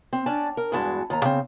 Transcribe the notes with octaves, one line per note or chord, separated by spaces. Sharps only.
C4
C#4 D4 D5 A5
A#4
E2 G2 E3 G#3 F#4 A5
D#2 A#5
C#3 C4